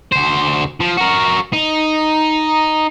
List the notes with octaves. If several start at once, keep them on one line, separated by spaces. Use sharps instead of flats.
D2 C5
F3
F#4 A#4
D#4